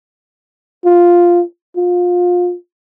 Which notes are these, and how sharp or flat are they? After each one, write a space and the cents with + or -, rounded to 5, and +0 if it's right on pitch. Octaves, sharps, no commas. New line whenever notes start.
F4 +0
F4 +25